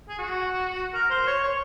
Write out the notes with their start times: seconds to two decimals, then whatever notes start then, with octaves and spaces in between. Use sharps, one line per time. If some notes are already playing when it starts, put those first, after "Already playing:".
0.09 G#4
0.18 F#4
0.94 A#4
1.10 C5
1.27 C#5
1.44 C#5